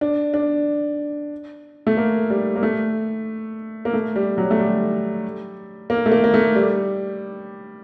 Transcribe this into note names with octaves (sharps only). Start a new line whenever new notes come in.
D4
D4
A3
A#3
G3
A#3
A3
A#3
A3
G3
F#3
A3
G3
A#3
A3
A#3
A#3
A3
G3